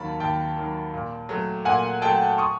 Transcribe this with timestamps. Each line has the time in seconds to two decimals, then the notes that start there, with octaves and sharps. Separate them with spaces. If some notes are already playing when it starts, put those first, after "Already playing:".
Already playing: D#2 D#3 F#3 A5 B5
0.20 D#2 G5 A5
0.57 D#3 F#3
0.94 A#2
1.29 F#3 A3
1.65 A#2 F#5 G#5
2.02 F#3 A3 G5 A5
2.38 C#6 D#6